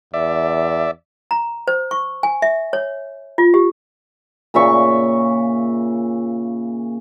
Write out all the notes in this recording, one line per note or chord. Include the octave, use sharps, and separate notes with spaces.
E2 D5 E5
A#5
C5
C#6
G#5
E5
C#5
F4
G4
A#2 C#3 E5 C#6